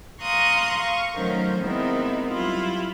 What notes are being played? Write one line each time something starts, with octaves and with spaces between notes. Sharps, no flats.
F5 A#5 C6 C#6 D#6 F#6
F5 C#6
D#3 F#3 A3 C#4 A#4 C5
G#3 B3 C4 D#4 E4 A#4
F#3 G3 E4 F4